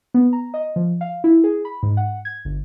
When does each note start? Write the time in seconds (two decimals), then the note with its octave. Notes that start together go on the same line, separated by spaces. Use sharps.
0.14 B3
0.33 A#5
0.54 D#5
0.76 F3
1.01 F5
1.24 E4
1.44 G#4
1.65 B5
1.83 G#2
1.97 F#5
2.25 G#6
2.45 G1